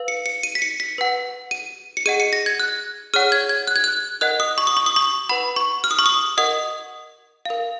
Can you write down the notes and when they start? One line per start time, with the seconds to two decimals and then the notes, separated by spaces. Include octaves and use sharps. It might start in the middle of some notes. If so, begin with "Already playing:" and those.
Already playing: B4 F5
0.08 C#7
0.26 C#7
0.43 D#7
0.55 B6
0.62 C#7
0.80 B6
0.98 B4 F#5
1.51 D#7
1.97 C#7
2.06 G#4 D#5 F#5 D#7
2.20 C#7
2.33 A#6
2.46 G#6
2.60 F#6
3.14 G#4 C#5 F#5 F6
3.32 G#6
3.49 G#6
3.67 F#6
3.76 G#6
3.84 F#6
4.21 A#4 D#5 F#5 F#6
4.40 D#6
4.58 C#6
4.67 D#6
4.77 C#6
4.86 D#6
4.96 C#6
5.29 B4 F#5 B5
5.56 C#6
5.84 F6
5.91 D#6
5.99 C#6
6.06 D#6
6.37 A#4 D#5 F#5 D#6
7.45 A#4 F5